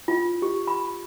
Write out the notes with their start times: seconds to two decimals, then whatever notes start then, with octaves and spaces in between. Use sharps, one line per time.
0.08 F4
0.42 G4
0.67 B5